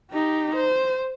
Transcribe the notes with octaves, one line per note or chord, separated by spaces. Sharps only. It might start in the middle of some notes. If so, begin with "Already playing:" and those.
D#4 G4
C5